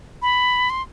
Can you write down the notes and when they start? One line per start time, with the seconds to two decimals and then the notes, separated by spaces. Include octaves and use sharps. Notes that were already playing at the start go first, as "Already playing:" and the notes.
0.22 B5
0.70 C6